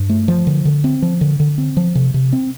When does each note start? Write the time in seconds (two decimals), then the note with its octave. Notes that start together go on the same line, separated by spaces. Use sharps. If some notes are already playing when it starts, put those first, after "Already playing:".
Already playing: G2
0.09 A3
0.28 F3
0.47 D3
0.65 D3
0.84 C4
1.02 F3
1.21 D3
1.40 D3
1.58 C4
1.77 F3
1.95 C3
2.14 C3
2.33 C4